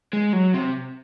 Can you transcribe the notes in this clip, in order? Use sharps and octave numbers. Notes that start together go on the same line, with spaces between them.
G#3
F#3
C3